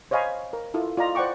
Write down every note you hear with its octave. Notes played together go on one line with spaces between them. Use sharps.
C5 C#5 D#5 F5 G#5 B5
A#4
E4 F4 A4
F4 D5 D#5 A#5
C5 D5 F#5 G5 C#6 D6